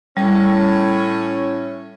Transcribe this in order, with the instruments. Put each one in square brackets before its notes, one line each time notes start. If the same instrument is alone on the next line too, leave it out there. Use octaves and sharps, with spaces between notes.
[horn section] A2 C#4 [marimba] G3